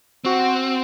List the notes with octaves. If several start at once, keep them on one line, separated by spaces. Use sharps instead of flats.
C4 F#4